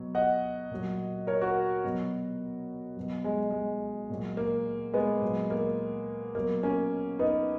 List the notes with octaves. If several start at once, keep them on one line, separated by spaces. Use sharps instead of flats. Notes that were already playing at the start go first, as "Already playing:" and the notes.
Already playing: B2 F#3
D#5 F#5
A#2 F#3
A#4 C#5
F#4 A#4
B2 F#3
B2 F#3
G#3
G#3
A#2 F#3
A#3
G#3 B3
A#2 F#3
A#3
B2 F#3 A#3
A#3 C#4
B3 D#4